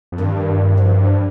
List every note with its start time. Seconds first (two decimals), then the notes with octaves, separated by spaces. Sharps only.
0.12 F2
0.19 G2 D#3
0.79 F3